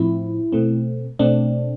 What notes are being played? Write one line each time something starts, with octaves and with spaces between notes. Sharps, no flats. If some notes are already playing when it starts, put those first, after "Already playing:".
Already playing: A2 F3 C4 E4
B2 A3 C4
B2 A3 C4 D4